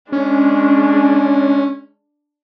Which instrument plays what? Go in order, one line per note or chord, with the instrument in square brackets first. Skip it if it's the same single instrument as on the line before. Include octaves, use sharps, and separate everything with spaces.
[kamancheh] G#3 D4 [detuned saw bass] C#4